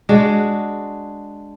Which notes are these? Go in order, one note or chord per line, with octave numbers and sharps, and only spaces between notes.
G#3 D4 F#4